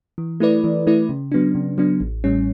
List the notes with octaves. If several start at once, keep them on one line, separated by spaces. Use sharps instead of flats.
E3
A3 E4 B4 D5
E3
A3 E4 B4 D5
C#3
F#3 B3 D4
C#3
F#3 B3 D4
A1
A2 G3 C#4